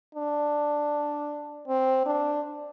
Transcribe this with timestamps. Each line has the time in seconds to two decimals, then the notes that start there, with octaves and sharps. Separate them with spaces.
0.15 D4
1.68 C4
2.06 D4